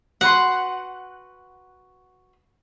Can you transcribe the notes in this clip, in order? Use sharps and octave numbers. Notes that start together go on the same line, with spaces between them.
F#4 B4 F#5 C6